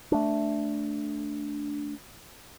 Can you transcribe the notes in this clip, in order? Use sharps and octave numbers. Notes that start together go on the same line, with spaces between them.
A3 D4